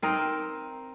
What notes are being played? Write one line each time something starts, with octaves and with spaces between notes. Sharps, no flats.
C4 D#4 A#4